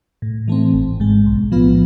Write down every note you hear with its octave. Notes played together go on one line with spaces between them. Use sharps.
A2
E3 A3 C4
G#1
G#2 G#3
B1
A2 F3 B3 F4